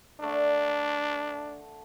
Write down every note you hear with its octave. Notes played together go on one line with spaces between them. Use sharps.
D3 A3 D4 A#4